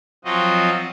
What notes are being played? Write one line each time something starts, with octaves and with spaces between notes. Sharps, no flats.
F3 F#3 C4 F4 F#4 D#5